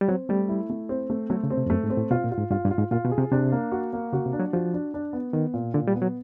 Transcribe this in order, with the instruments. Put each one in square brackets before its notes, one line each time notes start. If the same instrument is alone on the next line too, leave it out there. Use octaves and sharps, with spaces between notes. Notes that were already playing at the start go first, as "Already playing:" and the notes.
[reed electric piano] G3
[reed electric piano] F#3 [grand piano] C4
[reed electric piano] G3 [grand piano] A3
[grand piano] E4
A3
C4
A3
[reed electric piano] F#3 [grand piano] A3
[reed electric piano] C#3
[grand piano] C4
[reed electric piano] C3
F2
[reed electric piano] F#2 [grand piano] A3
[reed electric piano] G#2
[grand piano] C4
[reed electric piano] A2
[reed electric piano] B2 [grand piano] F4
[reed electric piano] A#2
[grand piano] F4
[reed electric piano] G#2
[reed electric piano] G2 [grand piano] F4
[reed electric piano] G2
[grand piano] F4
[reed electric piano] G#2
[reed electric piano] A#2 [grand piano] F4
[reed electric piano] B2
[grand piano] G#4
[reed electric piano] C3
[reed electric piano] C3 [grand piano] D4
[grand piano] A#3
F#4
A#3
[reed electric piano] C#3 [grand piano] F#4
[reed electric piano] C3
[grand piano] D4
[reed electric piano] F#3
[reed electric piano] F3 [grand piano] F#4
[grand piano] D4
D4
B3
[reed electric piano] D#3 [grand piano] B3
[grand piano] A#2
[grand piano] A#2 [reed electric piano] D3
[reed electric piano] G3
[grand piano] B3
[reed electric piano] F#3